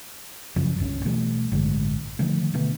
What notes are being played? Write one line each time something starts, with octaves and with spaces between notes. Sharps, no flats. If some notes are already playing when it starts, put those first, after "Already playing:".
F#2 C#3 F3 G3
G1 C#2 C#4
B2 E3 G3 A3
A1 G2 D3 G#3
D3 D#3 F3 A3
B2 D3 A3 B3